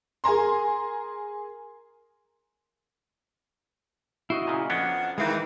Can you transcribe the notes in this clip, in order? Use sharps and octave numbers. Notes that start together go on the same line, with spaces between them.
G#4 A#4 G#5 A#5 C6
E4 F#4 C5 D#5
A#2 C#3
F2 B3 C#4 D4 F#5
D#3 E3 G#3 F5 G6